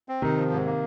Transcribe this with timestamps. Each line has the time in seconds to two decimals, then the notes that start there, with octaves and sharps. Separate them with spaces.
0.09 C4
0.22 C3 D#3 D#4
0.37 F3
0.51 G#2
0.65 A#3